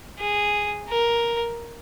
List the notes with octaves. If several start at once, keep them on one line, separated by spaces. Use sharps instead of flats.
G#4
A#4